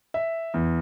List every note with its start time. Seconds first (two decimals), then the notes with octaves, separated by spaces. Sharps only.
0.14 E5
0.54 E2